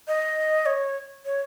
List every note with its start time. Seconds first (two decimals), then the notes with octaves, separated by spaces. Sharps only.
0.08 D#5
0.66 C#5
1.25 C#5